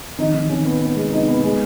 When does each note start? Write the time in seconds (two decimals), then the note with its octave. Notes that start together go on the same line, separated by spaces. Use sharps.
0.18 D#3 D#4
0.34 D#3
0.49 D#3 C#4
0.65 B3
0.81 B3
0.96 G#3
1.12 B3 D#4
1.28 B3
1.44 G#3